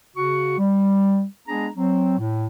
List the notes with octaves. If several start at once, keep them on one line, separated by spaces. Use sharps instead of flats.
C#3 F#4 C#6
G3
G#3 B3 D4 G#4 A#5
F#3 C4
A2